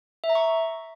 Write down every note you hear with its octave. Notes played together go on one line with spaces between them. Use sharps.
E5
A#5
C#6